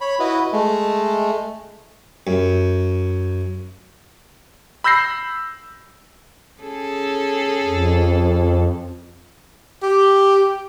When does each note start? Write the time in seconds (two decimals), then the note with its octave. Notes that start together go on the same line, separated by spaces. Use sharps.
0.01 C#5 B5
0.19 E4 F#4 B4 D#5
0.52 G#3 A3
2.27 F#2
4.84 B5 E6 G6 A#6 C7
6.62 C#4 G#4 A4
7.64 F2
9.83 G4